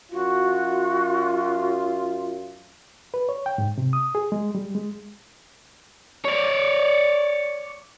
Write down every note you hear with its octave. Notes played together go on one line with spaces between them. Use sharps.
F#2 F4 F#4
B4
C#5
G5
G#2
C3
D#6
G#4
G#3
G3
G#3
C#5 D5